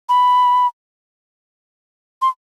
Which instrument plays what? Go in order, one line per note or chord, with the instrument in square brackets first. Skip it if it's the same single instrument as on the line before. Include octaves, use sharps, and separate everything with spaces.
[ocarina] B5
C6